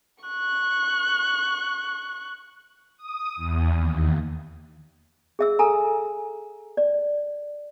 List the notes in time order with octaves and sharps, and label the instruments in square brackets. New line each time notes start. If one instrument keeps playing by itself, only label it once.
[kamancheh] C#6 F#6
[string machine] D#6
E2
D#2
[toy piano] G#4 E5 E6
A4 G#5 A#5
D5